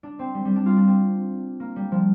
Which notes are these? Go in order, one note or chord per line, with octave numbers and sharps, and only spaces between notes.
D4
C4
G3
G3
D4
F4
D4
C4
A#3
G3
F3